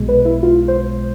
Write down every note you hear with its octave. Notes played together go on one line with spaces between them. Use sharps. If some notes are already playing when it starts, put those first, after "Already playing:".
Already playing: B1 B2 G#3
B4
E4
F4
C5